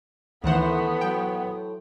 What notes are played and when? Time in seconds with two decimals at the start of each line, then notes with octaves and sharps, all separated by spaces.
0.44 D2 A2 D#3 E3 B3 E4 C5 F#5
1.01 F#3 G5